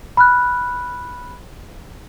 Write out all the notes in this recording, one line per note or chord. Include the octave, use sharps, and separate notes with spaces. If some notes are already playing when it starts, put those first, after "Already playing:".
B5 F6 F#6